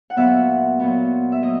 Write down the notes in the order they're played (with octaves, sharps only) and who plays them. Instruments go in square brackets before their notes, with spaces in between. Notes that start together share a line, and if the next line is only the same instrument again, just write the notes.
[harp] F#5
A#2 F#3 B3 E5
A#2 F#3 B3
E5
F#3 A#3 D#5